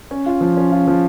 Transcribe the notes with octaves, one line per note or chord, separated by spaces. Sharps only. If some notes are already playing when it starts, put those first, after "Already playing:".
C#4
F4
F3
C#4
F4
F3